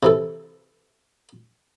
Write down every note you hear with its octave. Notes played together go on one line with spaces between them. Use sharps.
C3 E3 A4